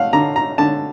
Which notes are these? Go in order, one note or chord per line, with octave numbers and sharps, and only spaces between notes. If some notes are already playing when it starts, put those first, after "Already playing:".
Already playing: A3 F5 F#5
D3 A#5
A#5
D3 A5